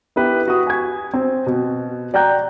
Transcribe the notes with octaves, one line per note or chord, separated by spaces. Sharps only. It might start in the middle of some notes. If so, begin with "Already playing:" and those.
B3 E4 G4 B4
F#4 D#6
G#5 G#6
C4
B2
D5 G5 A#5 F#6 G6